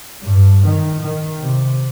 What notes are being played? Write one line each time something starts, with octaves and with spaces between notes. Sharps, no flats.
G2
D#3
D#3
C3